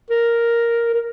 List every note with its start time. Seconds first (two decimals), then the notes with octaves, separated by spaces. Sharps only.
0.10 A#4
0.94 A#4